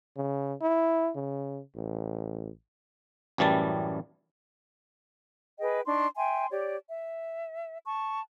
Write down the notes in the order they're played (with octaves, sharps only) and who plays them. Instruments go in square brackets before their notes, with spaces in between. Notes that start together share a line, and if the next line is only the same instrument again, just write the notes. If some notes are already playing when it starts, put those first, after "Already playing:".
[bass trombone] C#3
E4
C#3
A1
[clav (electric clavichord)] A1 F#2 E3 G3 A5
[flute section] G#4 B4 D#5 G5
D4 D#4 C6 C#6
E5 G5 G#5 C6
G4 C#5 D5
E5
A5 C#6